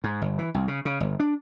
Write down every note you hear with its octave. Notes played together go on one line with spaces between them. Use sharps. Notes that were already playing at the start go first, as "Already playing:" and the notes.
G#2
G1
E3
C2
C#3
C#3
G1
D4